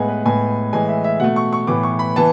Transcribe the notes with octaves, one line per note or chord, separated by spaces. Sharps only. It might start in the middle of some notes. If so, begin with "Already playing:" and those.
Already playing: A2 G#3 B3 F#5 G#5
B4
A2 G#3 B3 G#5
A2 E3 G#3 G#5
E5
E5
B2 A3 F#5
C#6
C#6
A2 E3 B3 D6
C#6
B5
E3 B3 A5